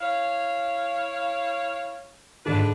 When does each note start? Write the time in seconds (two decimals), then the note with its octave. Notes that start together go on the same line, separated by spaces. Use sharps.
0.01 E4 C#5 F5
2.46 G#2 D3 D4 B4